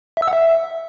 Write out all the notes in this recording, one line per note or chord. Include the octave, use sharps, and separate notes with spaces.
E5
E6
F#5
E5